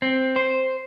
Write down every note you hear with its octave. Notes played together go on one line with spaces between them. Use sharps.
C4
C5